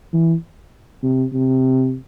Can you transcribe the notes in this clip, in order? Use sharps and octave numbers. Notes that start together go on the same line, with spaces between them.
E3
C3
C3